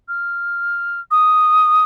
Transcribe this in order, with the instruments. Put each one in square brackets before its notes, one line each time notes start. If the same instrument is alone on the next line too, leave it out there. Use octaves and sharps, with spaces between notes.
[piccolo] F6
D#6